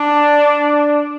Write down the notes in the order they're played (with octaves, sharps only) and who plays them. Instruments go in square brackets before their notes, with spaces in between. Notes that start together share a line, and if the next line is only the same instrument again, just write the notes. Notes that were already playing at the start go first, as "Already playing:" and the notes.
Already playing: [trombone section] D4